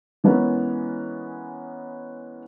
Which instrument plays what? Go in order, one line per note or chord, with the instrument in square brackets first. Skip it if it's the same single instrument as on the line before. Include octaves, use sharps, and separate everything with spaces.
[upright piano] E3 G#3 B3 C#4 A#4